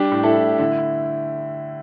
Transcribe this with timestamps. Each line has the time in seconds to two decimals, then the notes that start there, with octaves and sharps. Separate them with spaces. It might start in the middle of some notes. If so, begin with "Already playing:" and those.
Already playing: G3 D4 G4
0.12 A2
0.23 E4 A4
0.36 A2
0.58 D3 E4